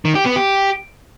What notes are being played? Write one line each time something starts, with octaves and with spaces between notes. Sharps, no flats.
D#3
G4
B3
G4